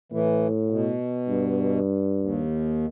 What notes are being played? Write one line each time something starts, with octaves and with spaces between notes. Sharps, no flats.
A2 E3
B2
G2
D#2